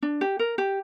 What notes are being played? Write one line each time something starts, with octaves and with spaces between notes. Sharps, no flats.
D4
G4
A#4
G4